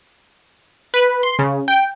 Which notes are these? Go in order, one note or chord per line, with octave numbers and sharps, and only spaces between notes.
B4
C6
C#3
G5